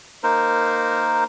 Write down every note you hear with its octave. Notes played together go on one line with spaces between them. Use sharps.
A#3 D#4 A#4 C5